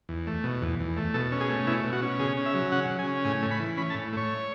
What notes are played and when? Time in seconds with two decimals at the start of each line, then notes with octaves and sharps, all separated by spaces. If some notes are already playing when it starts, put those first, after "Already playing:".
0.09 E2
0.27 A3
0.44 B2
0.62 E2
0.79 E2
0.97 A3
1.14 B2 A4
1.32 C#4
1.41 G#4
1.49 A3
1.67 B2 E4
1.84 B2
1.93 F#4
2.02 C#4
2.19 C#3 G#4
2.37 C#4
2.46 E5
2.54 F#3
2.72 C#3 F#5
2.90 C#3
2.99 G#5
3.07 C#4
3.24 A2 G#5
3.42 A3
3.51 B5
3.59 E3
3.77 C#4 B5
3.90 A5
3.94 A2
4.13 A3 C#5